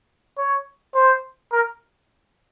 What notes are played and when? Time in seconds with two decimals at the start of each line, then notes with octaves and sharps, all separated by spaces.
0.37 C#5
0.95 C5
1.52 A#4